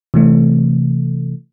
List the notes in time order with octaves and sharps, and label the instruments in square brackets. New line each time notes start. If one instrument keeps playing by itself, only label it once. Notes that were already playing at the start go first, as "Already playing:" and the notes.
[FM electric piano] C3 E3 A3